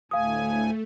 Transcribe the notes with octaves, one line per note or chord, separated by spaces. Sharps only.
D2 A2 A3 F5 G#5 D#6